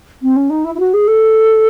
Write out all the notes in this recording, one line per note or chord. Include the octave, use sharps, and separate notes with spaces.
C4
C#4
D#4
E4
E4
F#4
G#4
A4